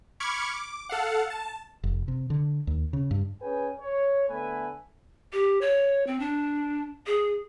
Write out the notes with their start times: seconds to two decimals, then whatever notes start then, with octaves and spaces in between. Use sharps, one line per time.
0.20 B5 C#6 D6 F6 G#6 C#7
0.54 D6
0.89 A4 F5 F#5
1.30 A5
1.83 F1
2.08 C3
2.30 D3
2.67 D#2
2.93 C#3
3.11 G2
3.42 C#4 G#4 B4 G5 G#5
3.80 C#5
4.29 D3 A3 B3 B4 E5 G#5
5.33 G4
5.61 C#5
6.07 C4
6.20 D4
7.07 G#4